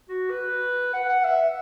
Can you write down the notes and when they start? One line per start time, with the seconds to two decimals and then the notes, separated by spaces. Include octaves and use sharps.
0.09 F#4
0.30 B4
0.93 F#5
1.09 F#5
1.24 E5